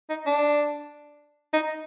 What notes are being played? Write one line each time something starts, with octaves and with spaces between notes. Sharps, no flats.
D#4
D4
D#4